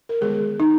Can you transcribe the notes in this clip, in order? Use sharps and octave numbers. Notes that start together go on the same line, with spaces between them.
A#4
D#3 G#3 B3 G#4
D#4